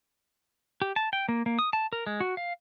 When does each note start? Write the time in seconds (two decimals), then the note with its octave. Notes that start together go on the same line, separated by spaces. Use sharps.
0.82 G4
0.96 A5
1.13 G5
1.29 A#3
1.46 A#3
1.59 D#6
1.73 A5
1.93 A#4
2.07 G#3
2.20 F#4
2.37 F5